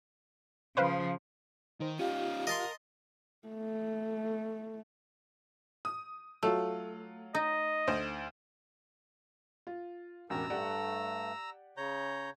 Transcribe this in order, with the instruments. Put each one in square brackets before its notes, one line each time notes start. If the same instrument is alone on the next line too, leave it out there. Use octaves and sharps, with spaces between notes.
[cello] C#3 F3 [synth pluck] B4 C5 F5
[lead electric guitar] D#3 [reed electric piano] D#4 C5
[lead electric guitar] C#4 D#4 [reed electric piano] F4 G4 [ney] F5
[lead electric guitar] A#4 [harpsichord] D#5 A5 C6
[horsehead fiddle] A3
[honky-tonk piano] D#6
[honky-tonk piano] F#3 F4 [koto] A3
[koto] D#4 [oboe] D#5
[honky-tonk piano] D2 C5
[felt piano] F4
[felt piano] E1 A1 [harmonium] F#4 G4 A#4 [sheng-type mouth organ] A#5 E6
[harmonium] G2 A3 [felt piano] G4 D5 F#5
[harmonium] C#3 [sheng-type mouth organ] C#5 A#5 G6